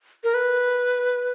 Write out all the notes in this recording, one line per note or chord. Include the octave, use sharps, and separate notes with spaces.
A#4
B4